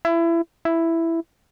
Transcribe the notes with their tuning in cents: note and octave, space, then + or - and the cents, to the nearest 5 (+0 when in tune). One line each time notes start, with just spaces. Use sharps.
E4 +25
E4 +5